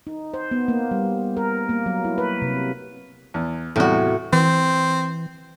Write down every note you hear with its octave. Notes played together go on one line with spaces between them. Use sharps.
D#4
C5
B3
A#3
G3
A#4
A#3
F#3
E4
B4
C3
E2
E2 A2 C3 G3 F#4
E3 C4